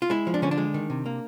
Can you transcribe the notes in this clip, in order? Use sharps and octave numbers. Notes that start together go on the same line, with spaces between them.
F4
G#3 E4
F3
D4
D3 C#4
D4
G#3
D#3
C3
A#3